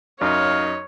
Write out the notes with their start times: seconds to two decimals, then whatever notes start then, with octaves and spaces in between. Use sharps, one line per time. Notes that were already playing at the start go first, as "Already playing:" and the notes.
0.21 F#2 D#4 C#5 F5